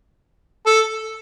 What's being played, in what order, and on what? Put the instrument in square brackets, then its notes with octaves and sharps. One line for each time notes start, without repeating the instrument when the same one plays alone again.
[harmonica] A4